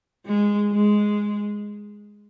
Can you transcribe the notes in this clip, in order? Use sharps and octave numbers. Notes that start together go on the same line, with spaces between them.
G#3
G#3